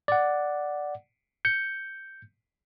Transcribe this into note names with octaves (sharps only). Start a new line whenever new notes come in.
D5 F#5
G6 C#7